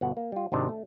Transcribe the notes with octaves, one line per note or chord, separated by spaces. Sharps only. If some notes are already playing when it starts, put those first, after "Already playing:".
G1 B2 F#5
A#3
G3 F4
G#1 C3 D4 D#4 G5
A3